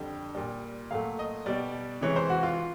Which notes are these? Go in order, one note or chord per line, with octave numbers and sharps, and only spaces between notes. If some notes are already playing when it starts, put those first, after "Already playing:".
Already playing: F2 D3 G3 G5
A#2 G3
A#2 F#3 A3 F5
D#5
B2 G3 D5
C3 E3 G#3 C#5
C5
F#4
F4